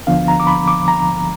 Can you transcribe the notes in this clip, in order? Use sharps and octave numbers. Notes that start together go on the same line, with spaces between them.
D2 D3 F3 B3 D4 F5
A#5
D6
B5
D6
A#5